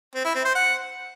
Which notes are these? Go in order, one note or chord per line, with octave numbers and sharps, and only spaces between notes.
C4
E4
C4
C5
F#5